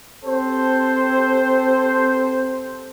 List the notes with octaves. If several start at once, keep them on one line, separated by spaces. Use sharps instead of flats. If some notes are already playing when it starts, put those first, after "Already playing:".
C4 G4 A4 C5